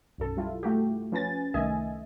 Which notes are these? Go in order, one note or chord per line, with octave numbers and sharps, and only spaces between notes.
B1 F#2 A4
G3 E4 F4
A3 F#4 G4
F3 C#4 B4 G#5 A6
C2 D#3 A3 D#5 E5 G#5